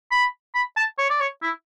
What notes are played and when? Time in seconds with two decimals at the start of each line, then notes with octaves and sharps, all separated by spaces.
0.11 B5
0.55 B5
0.77 A5
0.98 C#5
1.10 D5
1.20 C#5
1.43 E4